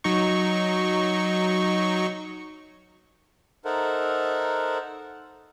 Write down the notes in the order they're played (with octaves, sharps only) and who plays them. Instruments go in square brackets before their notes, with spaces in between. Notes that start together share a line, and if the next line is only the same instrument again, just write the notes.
[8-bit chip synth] F#3 D#4 C#6
[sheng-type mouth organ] D#4 A4 A#4 C5 E5 F#5